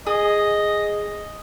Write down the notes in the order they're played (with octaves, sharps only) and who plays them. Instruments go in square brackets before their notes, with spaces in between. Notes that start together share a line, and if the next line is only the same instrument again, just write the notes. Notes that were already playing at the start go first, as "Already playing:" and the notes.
[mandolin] G#4 [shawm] D#5